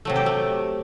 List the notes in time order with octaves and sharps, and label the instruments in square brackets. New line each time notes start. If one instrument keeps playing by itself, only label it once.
[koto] C3 F#3 A3
G4
A3